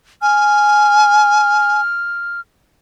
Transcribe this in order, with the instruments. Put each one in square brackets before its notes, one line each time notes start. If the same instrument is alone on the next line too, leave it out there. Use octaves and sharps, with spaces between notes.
[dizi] G#5 [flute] F6